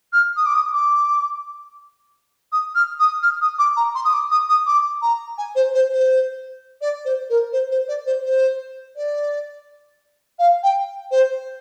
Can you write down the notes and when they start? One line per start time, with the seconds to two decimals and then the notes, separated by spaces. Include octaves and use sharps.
0.13 F6
0.36 D#6
0.45 D6
0.54 D#6
0.73 D6
2.52 D#6
2.75 F6
2.99 D#6
3.23 F6
3.41 D#6
3.58 D6
3.76 A#5
3.95 C6
4.05 D#6
4.13 D6
4.31 D#6
4.49 D#6
4.66 D6
5.02 A#5
5.38 G#5
5.55 C5
5.74 C5
5.92 C5
6.81 D5
7.05 C5
7.29 A#4
7.52 C5
7.71 C5
7.88 D5
8.06 C5
8.24 C5
8.96 D5
10.39 F5
10.63 G5
11.11 C5